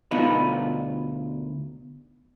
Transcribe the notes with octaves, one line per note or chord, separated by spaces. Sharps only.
D2 B2 B3 D#4 F4 B4